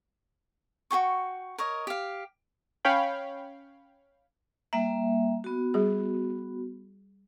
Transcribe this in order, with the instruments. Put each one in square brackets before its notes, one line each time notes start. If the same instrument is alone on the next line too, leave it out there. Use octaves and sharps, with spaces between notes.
[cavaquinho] F#4 G#4 G5 C#6
A#4 C#5 D#5
G4 F5
[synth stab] C#4 C#5 F5 G5 B5
[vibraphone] G3 A#3 E5 [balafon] A#5
[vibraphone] B3 F#4
[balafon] G3 G#4